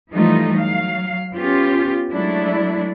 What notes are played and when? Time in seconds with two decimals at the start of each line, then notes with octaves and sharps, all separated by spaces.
0.11 E3 F3 G3 A3 D#4 F4
0.54 F#3 F5
1.33 B3 C#4 F4 G4
2.13 F#3 G#3 A3 D4 E4